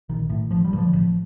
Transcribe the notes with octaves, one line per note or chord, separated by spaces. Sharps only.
A#1 D#3
A2
A1 F3
G3
G2
D3 F3
A1